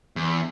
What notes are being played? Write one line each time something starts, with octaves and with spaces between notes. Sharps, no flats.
E2